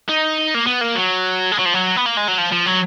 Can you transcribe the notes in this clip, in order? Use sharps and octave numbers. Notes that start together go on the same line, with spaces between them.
D#4
A#3
B3
A#3
F#3
G#3
F#3
F3
F#3
B3
A#3
G#3
F#3
F3
F3
F#3